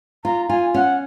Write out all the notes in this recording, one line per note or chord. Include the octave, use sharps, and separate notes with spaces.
F4 A#5
F4 G#5
C#4 F#5